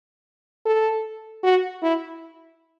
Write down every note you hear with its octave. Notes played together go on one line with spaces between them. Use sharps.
A4
F#4
E4